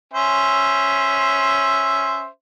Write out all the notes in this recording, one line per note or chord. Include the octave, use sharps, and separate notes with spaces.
C#4 C5 E5